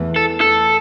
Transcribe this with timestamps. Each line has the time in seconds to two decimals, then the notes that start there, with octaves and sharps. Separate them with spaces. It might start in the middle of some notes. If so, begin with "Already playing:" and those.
Already playing: E2 E3 A3
0.16 A4
0.41 A4